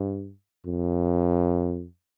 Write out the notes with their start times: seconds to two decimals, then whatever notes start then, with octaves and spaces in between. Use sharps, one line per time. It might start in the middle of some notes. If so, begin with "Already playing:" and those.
Already playing: G2
0.66 F2